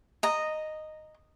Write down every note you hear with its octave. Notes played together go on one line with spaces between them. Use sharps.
D#5 A#5